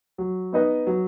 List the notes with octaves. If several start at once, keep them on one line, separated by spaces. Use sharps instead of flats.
F#3
B3 D#4 B4 D#5
F#3